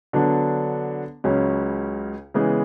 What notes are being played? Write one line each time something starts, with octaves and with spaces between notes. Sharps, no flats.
D3 F#3 B3 D4
C#2 C#3 F#3 C#4
C#3 E3 G#3 B3